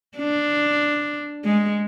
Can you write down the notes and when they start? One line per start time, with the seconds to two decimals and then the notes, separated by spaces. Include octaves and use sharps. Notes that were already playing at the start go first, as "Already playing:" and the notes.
0.18 D4
1.44 G#3